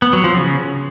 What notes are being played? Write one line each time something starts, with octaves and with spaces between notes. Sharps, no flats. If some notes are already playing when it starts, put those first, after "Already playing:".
B3
F#3
F3
C#3